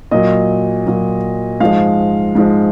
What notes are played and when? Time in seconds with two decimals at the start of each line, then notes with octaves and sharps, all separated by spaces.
0.11 A#2 F#3 D#5
0.86 A#2 F#3
1.60 G#2 F3 G#3 F5
2.35 G#2 F3 G#3